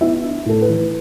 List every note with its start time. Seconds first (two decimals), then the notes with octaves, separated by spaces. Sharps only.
0.01 B3 E4 E5
0.24 D4
0.46 A2 A4
0.62 B4
0.69 E3